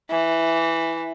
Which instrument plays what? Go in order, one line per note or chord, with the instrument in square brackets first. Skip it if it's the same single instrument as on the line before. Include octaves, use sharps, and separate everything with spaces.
[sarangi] E3